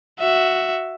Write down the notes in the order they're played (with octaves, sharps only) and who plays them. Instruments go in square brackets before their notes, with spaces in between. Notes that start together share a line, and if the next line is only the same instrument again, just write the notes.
[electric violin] F#4 E5